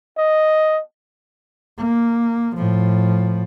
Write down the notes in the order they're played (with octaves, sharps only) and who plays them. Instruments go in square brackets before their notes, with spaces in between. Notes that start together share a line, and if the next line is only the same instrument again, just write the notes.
[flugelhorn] D#5
[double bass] A#3
A2 F3